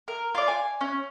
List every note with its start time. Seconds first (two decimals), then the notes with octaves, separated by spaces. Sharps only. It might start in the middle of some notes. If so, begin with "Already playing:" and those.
0.08 A#4
0.35 F4 D5
0.48 G#5
0.81 C#4